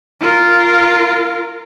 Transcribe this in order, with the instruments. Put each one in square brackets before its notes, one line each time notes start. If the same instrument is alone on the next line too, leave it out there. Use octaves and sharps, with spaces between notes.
[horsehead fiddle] F4 A#4